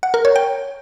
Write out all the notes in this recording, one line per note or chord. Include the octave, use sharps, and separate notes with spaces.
F#5
A#4
C#5
G5